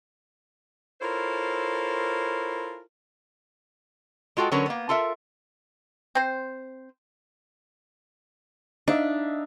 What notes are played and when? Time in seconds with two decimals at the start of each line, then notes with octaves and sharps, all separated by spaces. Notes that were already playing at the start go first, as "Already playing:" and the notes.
1.01 E4 F4 A4 A#4 C5 C#5
4.37 G#3 F4 F#4 A4 G5
4.51 D3 F#3 C#4 A#4 B4 C#5
4.66 A#3 B3
4.89 F4 A4 A#4 E5
6.15 C4 C5
8.88 D4 D#4 E5 F5